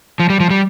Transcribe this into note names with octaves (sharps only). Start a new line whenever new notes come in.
F3
G3
F3
G3